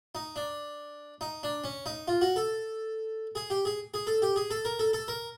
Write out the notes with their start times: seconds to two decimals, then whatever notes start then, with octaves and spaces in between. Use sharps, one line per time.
0.15 D#4
0.36 D4
1.21 D#4
1.43 D4
1.64 C#4
1.86 D#4
2.08 F4
2.21 F#4
2.36 A4
3.35 G#4
3.50 G4
3.65 G#4
3.94 G#4
4.07 A4
4.22 G4
4.36 G#4
4.51 A4
4.65 A#4
4.79 A4
4.93 A4
5.08 A#4